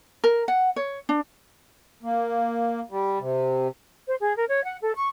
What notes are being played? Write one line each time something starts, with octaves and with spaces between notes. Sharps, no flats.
A#4
F#5
C#5
D4
A#3
G3
C3
C5
G#4
A#4
C#5
F#5
A4
C#6